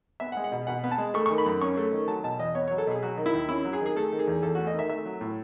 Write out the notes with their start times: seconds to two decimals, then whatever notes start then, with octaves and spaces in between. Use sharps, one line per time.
0.20 B3 E5
0.32 F#5
0.37 G#3
0.44 F#5
0.52 B2
0.67 B2 F#5
0.84 B3
0.91 A5
0.98 G#3
1.14 A3 C#6
1.26 D#3 C#6
1.38 B5
1.46 F#2
1.62 C#4 C#6
1.77 A3
1.92 D#3
2.08 F#3 A5
2.24 B2 A5
2.39 E2 D#5
2.55 B3 C#5
2.68 F#3 C#5
2.78 A4
2.87 B2 G#4
3.03 F#3 F#4
3.17 D#3
3.26 E4
3.34 D#2
3.49 C#4 E4
3.65 F#3
3.73 G#4
3.81 D#3
3.86 G#4
3.96 A3 A4
4.12 D#3
4.19 G#4
4.28 E2
4.43 E2 A4
4.55 A3 F#4
4.67 D#5
4.74 D#3 E5
4.90 A3 E5
5.05 F#3
5.21 A2